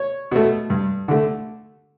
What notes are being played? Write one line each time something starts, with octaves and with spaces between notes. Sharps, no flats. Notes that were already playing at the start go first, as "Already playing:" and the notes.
Already playing: C#5
B2 A3
G2
D3 A3